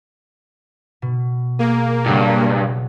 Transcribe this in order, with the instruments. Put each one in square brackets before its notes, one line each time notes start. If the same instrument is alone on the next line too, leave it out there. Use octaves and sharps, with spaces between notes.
[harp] B2
[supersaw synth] A#3 [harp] G#4
[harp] F#1 C#5 F#5 [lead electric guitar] G2